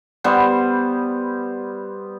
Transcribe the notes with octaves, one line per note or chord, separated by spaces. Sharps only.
G3 B3 C5